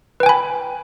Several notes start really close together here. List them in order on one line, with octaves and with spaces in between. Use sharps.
B4 G5 G#5 B5